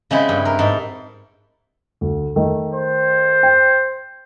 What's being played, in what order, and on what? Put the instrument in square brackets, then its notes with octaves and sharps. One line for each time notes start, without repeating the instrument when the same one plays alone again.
[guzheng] C#3 G#3 C4 E4
G2
A#4
G#2 A4
[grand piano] D2
D#3 A3
[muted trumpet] C5
[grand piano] G5